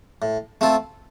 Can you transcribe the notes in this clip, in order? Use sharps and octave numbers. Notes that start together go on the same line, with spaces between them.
A2
A3 C4 F4 A4